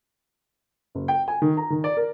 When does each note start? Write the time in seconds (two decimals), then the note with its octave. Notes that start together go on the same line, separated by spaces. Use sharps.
0.95 F#1
1.08 G5
1.28 G#5
1.42 D#3
1.57 A#5
1.70 D#3
1.84 D5
1.97 A#4